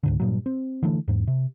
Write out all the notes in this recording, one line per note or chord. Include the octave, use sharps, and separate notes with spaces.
C#2 G#2 D3
G2 A#2 F#3
C4
D3 E3 A3
E2 G#2
C3